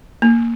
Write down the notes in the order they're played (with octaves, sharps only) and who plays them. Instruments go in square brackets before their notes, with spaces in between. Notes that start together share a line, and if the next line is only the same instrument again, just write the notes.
[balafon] A#3